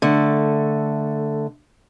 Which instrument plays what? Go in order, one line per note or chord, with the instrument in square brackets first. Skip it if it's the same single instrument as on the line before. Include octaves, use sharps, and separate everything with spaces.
[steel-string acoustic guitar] D3 A3